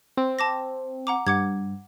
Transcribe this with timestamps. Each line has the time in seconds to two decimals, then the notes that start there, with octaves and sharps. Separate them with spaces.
0.17 C4
0.39 A5 D6 A#6
1.07 F#5 A#5 D6
1.27 G2 F#5 D6 G#6